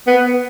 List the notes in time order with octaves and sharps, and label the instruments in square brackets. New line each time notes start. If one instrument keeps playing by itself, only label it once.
[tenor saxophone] B3